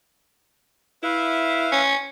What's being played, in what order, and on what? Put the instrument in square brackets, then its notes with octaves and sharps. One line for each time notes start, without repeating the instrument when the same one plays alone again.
[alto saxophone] E4 [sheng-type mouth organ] B4 E5 F5
[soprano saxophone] C#4